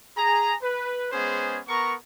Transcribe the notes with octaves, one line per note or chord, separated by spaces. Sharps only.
G#4 A#5
B4
G#3 B3 C#4 G#4 C5
B3 A#4 A#5 C#6